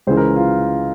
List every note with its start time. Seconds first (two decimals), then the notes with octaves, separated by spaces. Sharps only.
0.07 C#2 C#3 E3 C5
0.17 A#4
0.36 F4